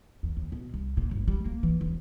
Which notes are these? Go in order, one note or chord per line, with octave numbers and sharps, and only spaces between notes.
E2
D#2
B2
C2
A#2
G1
G3
A#3
E3
E1